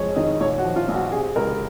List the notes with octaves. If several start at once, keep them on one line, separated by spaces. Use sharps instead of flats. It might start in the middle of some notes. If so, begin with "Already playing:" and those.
Already playing: F2 G#3 C#5
D#3 D#5
A#1 C#5
F#4
F3
F4
A#1
F#4
C3 G#4
C#2 A#4